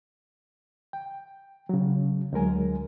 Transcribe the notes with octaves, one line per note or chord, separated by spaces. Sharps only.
G5
C#3 F#3
D2 F#3 G#3 A#4 G#5